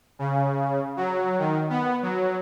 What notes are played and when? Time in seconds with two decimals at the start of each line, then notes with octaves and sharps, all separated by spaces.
0.19 C#3
0.97 F#3
1.38 D#3
1.70 B3
2.02 F#3